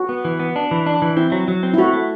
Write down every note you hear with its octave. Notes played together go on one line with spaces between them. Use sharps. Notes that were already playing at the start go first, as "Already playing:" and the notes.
Already playing: F#4
B3
E3
B3
D4
E3
D4
E3
C4 E4
F#3
F#3
C4
E4
A3 F#4
A3